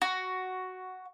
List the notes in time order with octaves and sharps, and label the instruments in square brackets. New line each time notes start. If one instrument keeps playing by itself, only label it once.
[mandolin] F#4